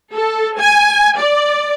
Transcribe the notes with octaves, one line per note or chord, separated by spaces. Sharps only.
A4
G#5
D5